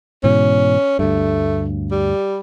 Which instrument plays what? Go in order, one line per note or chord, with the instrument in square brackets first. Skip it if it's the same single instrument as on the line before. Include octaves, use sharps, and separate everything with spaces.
[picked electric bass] G#2 B2 E3 [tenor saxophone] C#4
[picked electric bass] D2 G2 [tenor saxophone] A3
[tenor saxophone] G3